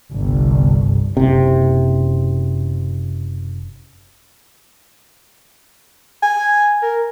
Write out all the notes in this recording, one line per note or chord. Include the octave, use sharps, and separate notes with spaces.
G1 C2
F#1 C3
G#5
A#4